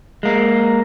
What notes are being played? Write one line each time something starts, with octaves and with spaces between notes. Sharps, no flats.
G#3 A#3